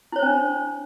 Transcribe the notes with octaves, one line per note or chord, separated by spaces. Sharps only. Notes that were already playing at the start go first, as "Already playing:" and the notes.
C#4 D4 E4 C5 C#5